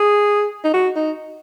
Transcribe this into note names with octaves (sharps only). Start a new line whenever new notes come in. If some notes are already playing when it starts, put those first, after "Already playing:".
Already playing: G#4
D#4
F#4
D#4